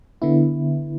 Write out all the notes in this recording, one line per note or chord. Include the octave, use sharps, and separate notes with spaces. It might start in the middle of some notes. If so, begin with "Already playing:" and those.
D3 B3 E4